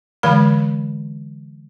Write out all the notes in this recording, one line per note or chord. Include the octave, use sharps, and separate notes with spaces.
D3 E3 G#3 B5